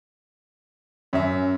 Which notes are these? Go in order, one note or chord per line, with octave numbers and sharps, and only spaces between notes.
F#2 C#4 E5